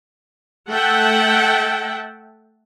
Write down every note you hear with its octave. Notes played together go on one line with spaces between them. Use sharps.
A3 A4 E5 F#5 G5 A5